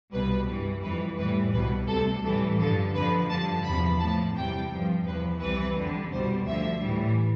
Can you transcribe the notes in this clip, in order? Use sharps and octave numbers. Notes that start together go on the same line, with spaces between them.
C2 B2 G3 B4
G2 E3 G3
F2 E3 G3 B4
A2 E3 G3 B4
C2 B2 G3 B4
D2 C3 G3 A4
A2 E3 G3 A4
G2 D3 F3 A4
F2 D3 F3 B4
G2 D3 F3 A5
E2 C3 F3 B5
A2 F3 A5
E2 C3 G3 G5
G2 F3
E2 C3 F3 B4
C2 C3 E3 G3 B4
F2 D3 G3
C2 B2 G3 C5
D2 D3 F3 E5
A2 E3 G3